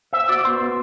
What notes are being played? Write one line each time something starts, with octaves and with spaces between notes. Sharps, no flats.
C5 E5
F#4 D5
B3 C5
B3